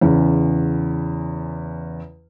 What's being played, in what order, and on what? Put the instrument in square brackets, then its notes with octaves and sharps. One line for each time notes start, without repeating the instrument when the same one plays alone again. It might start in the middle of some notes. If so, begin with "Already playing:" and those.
[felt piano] E2 C#3